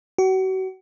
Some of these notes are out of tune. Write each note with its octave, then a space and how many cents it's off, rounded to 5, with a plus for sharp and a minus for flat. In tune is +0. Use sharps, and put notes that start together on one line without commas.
F#4 +35